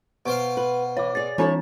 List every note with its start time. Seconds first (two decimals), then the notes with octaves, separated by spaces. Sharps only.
0.26 B2 C5 F5 F#5
0.57 B4
0.97 E3 C#5 D6
1.15 G#4 D5 A6
1.38 E3 C4 D4 E4 A4 C#5